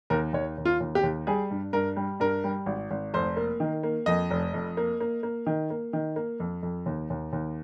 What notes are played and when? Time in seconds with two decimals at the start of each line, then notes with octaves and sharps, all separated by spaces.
0.10 D#2 A#4
0.33 D#2 C#5
0.58 D#2
0.65 F4
0.80 D#2
0.95 G4
1.03 D#2
1.27 G3 G#4
1.51 G2
1.73 G2 A#4
1.96 G3
2.20 G2 A#4
2.44 G3
2.66 G#1
2.91 G#1
3.14 F1 C5
3.37 A#3
3.60 D#3
3.83 A#3
4.06 F2 D#5
4.31 F1
4.54 F2
4.77 A#3
5.00 A#3
5.23 A#3
5.47 D#3
5.70 A#3
5.93 D#3
6.16 A#3
6.40 F2
6.63 F2
6.86 D#2
7.10 D#2
7.33 D#2